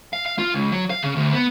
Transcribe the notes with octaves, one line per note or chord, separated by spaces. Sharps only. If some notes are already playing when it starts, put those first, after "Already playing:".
F5
F5
F4
C#2
F#3
F5
C#3
D2
B3